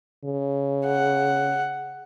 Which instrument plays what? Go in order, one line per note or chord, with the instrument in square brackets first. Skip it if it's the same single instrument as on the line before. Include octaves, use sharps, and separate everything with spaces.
[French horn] C#3
[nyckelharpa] F#5